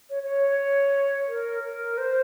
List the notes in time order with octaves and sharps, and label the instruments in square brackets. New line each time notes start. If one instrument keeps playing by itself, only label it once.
[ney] C#5
C#5
A#4
A#4
C5